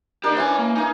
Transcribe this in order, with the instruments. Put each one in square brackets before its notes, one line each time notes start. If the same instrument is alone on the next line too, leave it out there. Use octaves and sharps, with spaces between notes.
[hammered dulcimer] D4 A#4 [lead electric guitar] D#4 G4
[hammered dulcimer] E3 C#4 [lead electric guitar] C5 G#5
[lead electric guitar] A#3
[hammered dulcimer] A#3 G#4 [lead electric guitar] D#4